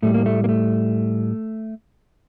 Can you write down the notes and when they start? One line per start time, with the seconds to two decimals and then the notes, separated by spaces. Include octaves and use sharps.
0.03 A2 G3 A3
0.14 A#3
0.26 A3
0.44 A#3
0.49 A3